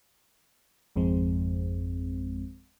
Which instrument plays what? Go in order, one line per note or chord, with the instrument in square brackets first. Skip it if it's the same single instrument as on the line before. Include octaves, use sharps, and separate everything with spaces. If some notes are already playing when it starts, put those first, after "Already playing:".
[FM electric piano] G#1 F2 G#3 C4